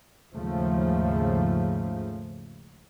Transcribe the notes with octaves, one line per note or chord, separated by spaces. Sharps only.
D#2 G#2 C#3 F3 A3